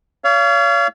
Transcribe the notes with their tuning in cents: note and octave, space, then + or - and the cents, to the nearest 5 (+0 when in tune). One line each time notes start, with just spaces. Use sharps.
C#5 +35 F5 -30